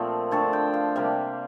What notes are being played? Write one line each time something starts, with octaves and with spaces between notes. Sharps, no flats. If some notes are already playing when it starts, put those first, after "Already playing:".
Already playing: A#2 F3 A3 C4
D3 A3 C4 A5
G5
F5
C3 G3 A#3